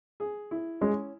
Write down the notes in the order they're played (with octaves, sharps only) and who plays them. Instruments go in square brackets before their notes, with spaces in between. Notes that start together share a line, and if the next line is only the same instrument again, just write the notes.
[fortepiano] G#4
E4
[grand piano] G#3 [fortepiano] C#4